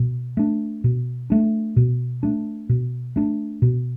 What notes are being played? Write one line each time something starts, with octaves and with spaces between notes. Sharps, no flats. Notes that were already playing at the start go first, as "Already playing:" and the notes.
Already playing: B2
A3 D4
B2
A3 D4
B2
A3 D4
B2
A3 D4
B2